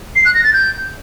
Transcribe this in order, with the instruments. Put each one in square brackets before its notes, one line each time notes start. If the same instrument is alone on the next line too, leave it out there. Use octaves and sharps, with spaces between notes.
[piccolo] C7
F#6
A#6
A6
G6